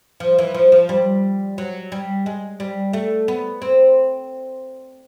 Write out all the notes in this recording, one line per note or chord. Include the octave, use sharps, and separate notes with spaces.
F3
E3
F3
F3
G3
F#3
G3
G#3
G3
A3
B3
C4